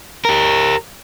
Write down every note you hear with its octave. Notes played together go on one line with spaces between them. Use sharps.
G4 A#4